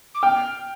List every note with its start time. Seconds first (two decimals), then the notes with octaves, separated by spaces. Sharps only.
0.14 D6
0.22 G5 F6